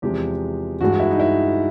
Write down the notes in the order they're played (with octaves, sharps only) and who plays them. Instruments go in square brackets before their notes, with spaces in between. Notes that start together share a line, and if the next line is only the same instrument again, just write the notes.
[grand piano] E2 C3 F3 G#3 G4
G2 E3 G#3 F#4
E4
D#4
E4